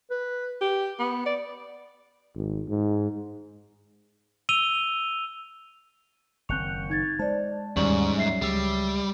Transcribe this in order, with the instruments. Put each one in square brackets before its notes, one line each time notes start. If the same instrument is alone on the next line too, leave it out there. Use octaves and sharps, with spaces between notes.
[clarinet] B4
[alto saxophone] G4
B3
D5
[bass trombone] G#1
G#2
[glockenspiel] E6 D#7 F7 G7
[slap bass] F#1 D#3 C4 [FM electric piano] C#6 G6 [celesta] F#6 C#7 F7
[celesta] D#4 G#6 A6
[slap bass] G#3 [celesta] C5 D5 [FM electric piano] A5
[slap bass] D#2 D3 [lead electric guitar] G#2 [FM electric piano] G3 C#4 [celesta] D5 C#6 F#7
[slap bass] F#3 [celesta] E5 C7
[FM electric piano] C#2 G#3 E6 [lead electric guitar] G3